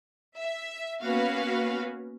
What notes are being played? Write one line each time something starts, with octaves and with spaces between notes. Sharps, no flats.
E5
A#3 B3 C#4 F#4 B4 F5